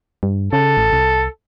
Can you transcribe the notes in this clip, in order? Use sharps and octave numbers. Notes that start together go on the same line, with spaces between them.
G2
C#3 A4
A1
C2